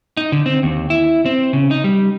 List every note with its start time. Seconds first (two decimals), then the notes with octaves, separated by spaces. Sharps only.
0.17 D#4
0.32 D3
0.46 C4
0.63 D#2
0.90 E4
1.25 C4
1.53 C#3
1.71 D#4
1.84 G3